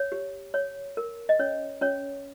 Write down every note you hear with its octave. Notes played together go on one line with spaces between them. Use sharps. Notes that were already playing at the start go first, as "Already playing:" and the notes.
Already playing: C#5
G4
C#5
A#4
D#5
C#4 C#5
C#4 C#5